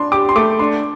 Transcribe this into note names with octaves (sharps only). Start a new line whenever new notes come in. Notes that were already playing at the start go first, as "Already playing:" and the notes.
Already playing: D4 C6
G4 D6
C6
A3 D6
D4 C6